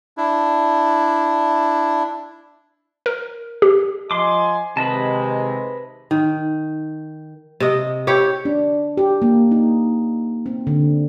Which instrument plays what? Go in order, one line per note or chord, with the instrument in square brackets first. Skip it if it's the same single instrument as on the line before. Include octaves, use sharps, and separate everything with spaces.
[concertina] D4 E4
[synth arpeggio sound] A#4
G4
[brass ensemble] F3 D#5 G#5 [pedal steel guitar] C6 D6
[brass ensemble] C3 D#3 G#3 [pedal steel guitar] B4 D#5 A5
[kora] D#3
C3 D#5
E4 G4 C#5
[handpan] D4
G4
A#3
D#4
C4
D3